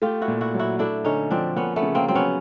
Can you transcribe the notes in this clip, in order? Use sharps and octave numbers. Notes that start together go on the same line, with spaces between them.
A3 F4 G4
E4 F#4
A#2
E4 F#4
F#3
E4 F#4
A3 D4 E4
D3 C#4 D#4
F3 C4 D4
A#3 B3 C#4
A3 B3
C#3
A#3 C4
F#3 C4
B3 C#4